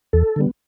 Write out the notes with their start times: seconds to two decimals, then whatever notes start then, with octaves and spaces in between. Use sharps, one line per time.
0.13 E2 A4
0.36 D3 G3 B3